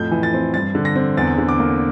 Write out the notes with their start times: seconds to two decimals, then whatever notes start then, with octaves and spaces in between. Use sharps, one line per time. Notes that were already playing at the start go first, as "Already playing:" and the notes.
Already playing: F2 A2 G6
0.11 E3
0.23 A6
0.34 C4
0.54 G2 A6
0.75 D3
0.85 A#6
0.96 C4
1.17 E2 A6
1.38 D3
1.49 D6
1.59 A#3